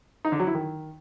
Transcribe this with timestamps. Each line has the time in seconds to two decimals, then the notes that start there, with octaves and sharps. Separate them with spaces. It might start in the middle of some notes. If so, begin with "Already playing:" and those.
0.25 D#4
0.32 D3
0.39 F#3
0.47 E4
0.54 D#3